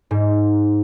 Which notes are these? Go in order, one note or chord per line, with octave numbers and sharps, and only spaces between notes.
G#2